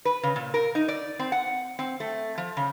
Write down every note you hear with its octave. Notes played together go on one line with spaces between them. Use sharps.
B4
C#3
A#2
A#4
D#4
D5
C4
F#5
C4
A3
F3
C#3